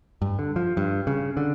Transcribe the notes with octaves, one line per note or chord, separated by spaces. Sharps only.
G2
D3
F3
G2
C#3
D3